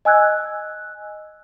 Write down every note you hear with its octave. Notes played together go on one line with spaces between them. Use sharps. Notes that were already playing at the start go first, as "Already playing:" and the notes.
D#5 G#5 E6 F#6 G#6